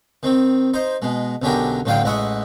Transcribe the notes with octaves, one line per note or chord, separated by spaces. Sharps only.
D#3 C4
D#4 C5
B2 G#3
B1 F#2 D3 C#4 G4 A#4
A1 A2 D3 F#3 F5 G5
A1 G#3 E4 F#5 C#6 D#6